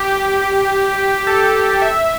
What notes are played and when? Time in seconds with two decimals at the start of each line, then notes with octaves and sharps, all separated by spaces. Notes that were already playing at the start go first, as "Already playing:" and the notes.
Already playing: G4
1.27 A4
1.82 E5